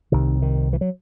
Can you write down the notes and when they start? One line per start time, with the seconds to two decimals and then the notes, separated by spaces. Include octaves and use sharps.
0.12 C2 C3 D#3
0.42 D#3
0.73 E3
0.81 F#3